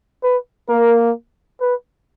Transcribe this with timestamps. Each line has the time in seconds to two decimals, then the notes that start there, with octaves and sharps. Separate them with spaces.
0.23 B4
0.69 A#3 A#4
1.61 B4